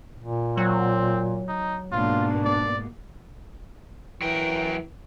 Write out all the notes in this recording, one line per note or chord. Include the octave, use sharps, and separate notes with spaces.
A#2
F#3 C4
D#4
G#2 B2 A#3 D4 F4
D5
E3 F#3 A#4 G5